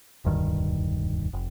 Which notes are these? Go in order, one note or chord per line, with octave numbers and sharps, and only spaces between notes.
E1 D2 G2 D#3
F1